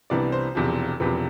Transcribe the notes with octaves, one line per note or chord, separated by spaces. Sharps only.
C2 C3 E3 B3 D4 D5
C5
E1 E2 C3 F3
E1 E2 C3 F3 B4